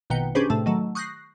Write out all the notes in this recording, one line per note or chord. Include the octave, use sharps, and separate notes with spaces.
A#1 B2 D#3 G5 C#7
C#4 D4 G4 G#4 B4 C5
A2 C3 A3
D#3 F#3 A3
C#6 D#6 F#6 G6 A#6 C7